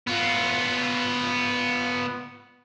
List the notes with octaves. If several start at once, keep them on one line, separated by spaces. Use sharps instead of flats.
B3 F4